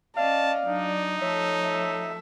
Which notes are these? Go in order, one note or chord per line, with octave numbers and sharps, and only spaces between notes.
C#4 D5 D#5 F5 A5
F#3 D4 D#4 D5
F3 A3 A4 C#5 E5
E5